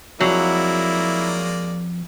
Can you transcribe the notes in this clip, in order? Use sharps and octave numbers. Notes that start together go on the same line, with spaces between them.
F2 F#3 G#3 A#3 E4 D5